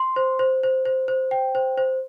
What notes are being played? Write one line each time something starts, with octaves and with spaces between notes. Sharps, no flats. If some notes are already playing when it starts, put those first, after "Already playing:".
Already playing: C6
C5
C5
C5
C5
C5
G5
C5
C5